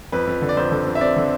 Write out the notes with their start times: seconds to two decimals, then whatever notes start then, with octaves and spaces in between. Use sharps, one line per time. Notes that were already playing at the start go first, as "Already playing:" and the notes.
0.12 F2 B4
0.27 F2
0.42 D3
0.49 D5
0.57 F2 C5
0.72 D3
0.86 F2
0.95 E5
1.01 C4 D5
1.16 D3